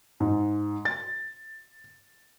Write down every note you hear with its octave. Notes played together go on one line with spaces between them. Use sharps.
G#2
A6